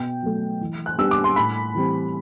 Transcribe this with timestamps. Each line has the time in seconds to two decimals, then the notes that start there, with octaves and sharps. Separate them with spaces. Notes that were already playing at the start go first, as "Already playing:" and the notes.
Already playing: B2 G5
0.23 F#3 A3
0.61 E3
0.86 F#6
0.98 G3 B3 D4 E6
1.11 D6
1.24 C6
1.36 A2 B5
1.74 E3 G3 C4